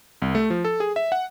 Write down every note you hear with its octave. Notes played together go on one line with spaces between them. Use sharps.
C2
A3
F3
A4
G#4
E5
F#5